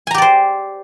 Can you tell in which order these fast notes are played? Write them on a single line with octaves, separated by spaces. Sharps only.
G#5 A#5 G4 D5 C5